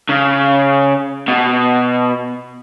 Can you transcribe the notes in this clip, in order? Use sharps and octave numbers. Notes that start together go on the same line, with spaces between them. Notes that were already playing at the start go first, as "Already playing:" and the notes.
C#3
B2